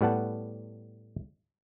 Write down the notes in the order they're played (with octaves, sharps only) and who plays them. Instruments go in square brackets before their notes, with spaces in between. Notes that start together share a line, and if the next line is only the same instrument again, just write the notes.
[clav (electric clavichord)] A2 G3 B3 F#5 A5